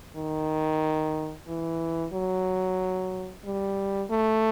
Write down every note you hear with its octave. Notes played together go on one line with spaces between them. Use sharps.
D#3
E3
F#3
G3
A3